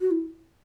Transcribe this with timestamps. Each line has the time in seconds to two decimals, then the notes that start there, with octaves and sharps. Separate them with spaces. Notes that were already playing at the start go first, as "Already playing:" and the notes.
0.01 F#4
0.11 E4